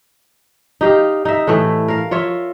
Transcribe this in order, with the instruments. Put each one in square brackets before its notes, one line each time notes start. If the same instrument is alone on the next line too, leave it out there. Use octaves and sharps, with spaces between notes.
[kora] D#4 G4 F5
D#4 E5
A2 E3 A3
A#4 F5
F4 C#5 E5